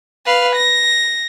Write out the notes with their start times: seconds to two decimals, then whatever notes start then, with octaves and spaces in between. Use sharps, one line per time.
0.26 B4 F5
0.56 A#6